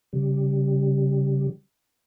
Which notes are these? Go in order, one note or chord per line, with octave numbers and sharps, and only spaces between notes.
C#3 G3